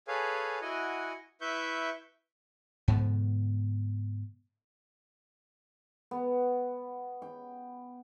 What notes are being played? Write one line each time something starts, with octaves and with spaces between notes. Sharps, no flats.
G#4 A4 B4 C#5 F5 G#5
E4 F#4 D#5 F#5 G#5
E4 B4 E5 C#6 G6
G#2 B2 D3 F3
B3
G5